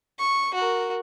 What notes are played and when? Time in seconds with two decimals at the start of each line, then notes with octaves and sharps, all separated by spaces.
0.19 C#6
0.54 F#4 A#4